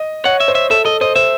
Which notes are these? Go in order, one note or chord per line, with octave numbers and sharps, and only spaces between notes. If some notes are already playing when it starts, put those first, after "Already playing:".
Already playing: D#5
C#5 F#5
E5
C5
E5
A4 E5
A4 D#5
C5 D#5
C5 E5